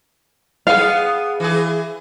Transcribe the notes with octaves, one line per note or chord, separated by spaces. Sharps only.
B3 G#4 F5
E3 G#4